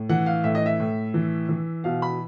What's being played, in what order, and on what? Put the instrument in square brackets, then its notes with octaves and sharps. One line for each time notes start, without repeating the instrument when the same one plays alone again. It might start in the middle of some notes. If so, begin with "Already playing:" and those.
Already playing: [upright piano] A2
E3 F#5
F5
A2 E5
D#5
E5
A2
E3
E3
B2 F5
B5